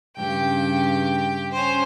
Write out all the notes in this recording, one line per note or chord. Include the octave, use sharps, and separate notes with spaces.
G2 C#3 G4 G5
C#4 C5